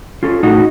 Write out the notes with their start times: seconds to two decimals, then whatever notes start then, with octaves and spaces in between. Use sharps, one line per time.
0.23 C#4 F4 A4
0.43 A2 D#4 F#4